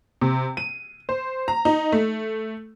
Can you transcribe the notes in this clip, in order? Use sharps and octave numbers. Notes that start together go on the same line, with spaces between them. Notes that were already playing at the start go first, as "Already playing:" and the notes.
C3
D#7
C5
A#5
D#4
A3